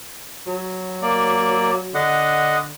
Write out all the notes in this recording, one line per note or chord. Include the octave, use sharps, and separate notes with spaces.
F#3
A#3 D5
D3 D#5 F#5